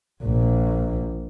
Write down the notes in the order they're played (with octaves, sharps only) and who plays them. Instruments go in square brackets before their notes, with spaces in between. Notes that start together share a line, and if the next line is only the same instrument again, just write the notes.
[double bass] A#1